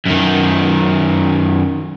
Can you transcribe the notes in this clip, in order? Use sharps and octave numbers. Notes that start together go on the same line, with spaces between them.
F#2 D#3